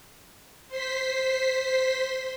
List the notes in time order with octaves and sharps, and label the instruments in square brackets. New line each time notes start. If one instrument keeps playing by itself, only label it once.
[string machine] C5 C6 B6